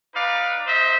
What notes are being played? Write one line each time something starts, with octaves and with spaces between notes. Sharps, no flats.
D#4 B4 D5 F5
D#4 C5 D#5 E5